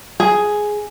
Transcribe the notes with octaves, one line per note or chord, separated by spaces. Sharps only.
G#4